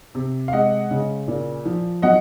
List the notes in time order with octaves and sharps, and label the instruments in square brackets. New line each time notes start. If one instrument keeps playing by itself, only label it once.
[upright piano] C3
F5
G#3 D#5 F#5
C#3
A#2
F3
F#3 D#5 F#5